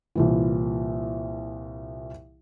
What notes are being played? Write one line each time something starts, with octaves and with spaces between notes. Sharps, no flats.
C2 A#2 E3